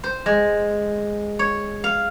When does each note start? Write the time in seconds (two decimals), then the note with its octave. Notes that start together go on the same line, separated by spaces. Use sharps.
0.04 C5
0.26 G#3
1.39 C#5
1.84 F5